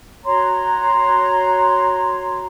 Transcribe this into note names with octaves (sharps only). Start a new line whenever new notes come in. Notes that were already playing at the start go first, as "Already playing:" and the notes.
F#4 C#5 A#5 C6